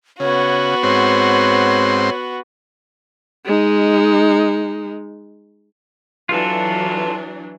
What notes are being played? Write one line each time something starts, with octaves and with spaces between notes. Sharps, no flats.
C#3 B3 F#4 C#5
G#2 C4 C#5 C6
G#3 D#4
E3 F#3 D4 F4 A4